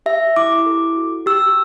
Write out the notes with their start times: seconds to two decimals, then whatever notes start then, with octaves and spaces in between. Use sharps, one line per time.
0.06 G4 E5
0.36 E4 D6
0.66 A4
0.96 F#4
1.26 G4 E6